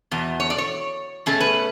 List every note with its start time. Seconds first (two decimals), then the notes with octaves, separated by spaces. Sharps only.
0.11 E2 B2
0.40 C#5
0.50 D5
0.58 C#5
1.26 B2 A3 C#4 G#4
1.40 B4